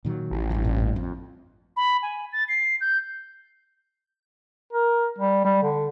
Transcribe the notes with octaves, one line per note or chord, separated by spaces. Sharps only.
A#2 D#3 F#3
A1
G2 F3
F#1 G2 A#2
F2
B5
G#5
A6
C7
G6
A#4
G3
G3
D3